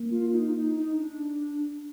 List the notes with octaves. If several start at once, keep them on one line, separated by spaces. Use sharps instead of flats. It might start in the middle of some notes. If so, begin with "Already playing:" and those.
Already playing: A#3
F4
D#4
D#4
D#4
D4